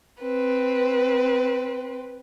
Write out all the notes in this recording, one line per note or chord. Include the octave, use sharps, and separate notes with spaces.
C4 B4